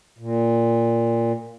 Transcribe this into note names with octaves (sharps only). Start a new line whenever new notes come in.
A#2